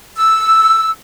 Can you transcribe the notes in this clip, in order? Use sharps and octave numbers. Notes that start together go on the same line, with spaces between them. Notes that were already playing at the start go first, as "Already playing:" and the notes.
E6